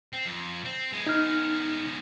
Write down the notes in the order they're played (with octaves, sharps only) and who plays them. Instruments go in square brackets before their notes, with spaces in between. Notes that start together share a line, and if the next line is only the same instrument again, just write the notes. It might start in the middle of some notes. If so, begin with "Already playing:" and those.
[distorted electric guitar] C4
F2
C4
G#3 B3
[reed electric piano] D#4 F6